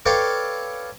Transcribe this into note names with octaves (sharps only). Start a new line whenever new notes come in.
A4 B4 C#5 D5 F5 G5